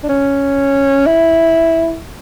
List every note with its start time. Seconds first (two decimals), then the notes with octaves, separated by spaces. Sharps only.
0.04 D4
0.09 C#4
1.06 E4